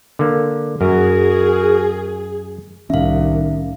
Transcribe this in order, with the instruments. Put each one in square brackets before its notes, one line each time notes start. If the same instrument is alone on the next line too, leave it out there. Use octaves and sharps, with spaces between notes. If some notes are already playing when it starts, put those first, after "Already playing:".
[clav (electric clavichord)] D3 A#3
[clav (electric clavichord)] F#2 [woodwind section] F#4 A#4 [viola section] G#4
[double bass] C2 [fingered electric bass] A2 C#4 [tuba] D#3 [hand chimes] E5 F5